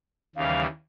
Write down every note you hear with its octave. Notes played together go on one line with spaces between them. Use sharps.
D#2 C#3 E3 G3 F5